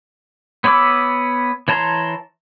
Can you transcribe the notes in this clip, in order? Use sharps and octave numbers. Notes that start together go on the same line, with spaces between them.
B3 C#5 B5 D6 E6
E3 C#5 A5 A#5 C6